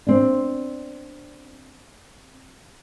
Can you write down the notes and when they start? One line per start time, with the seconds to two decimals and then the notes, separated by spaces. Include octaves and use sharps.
0.07 C4 D4